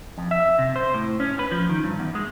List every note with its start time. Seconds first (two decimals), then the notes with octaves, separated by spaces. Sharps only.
0.18 F2
0.31 E5
0.59 C3
0.76 C5
0.94 A2
1.20 C#4
1.39 B4
1.52 F3
1.69 D#3
1.84 G2
1.99 E2
2.15 G#3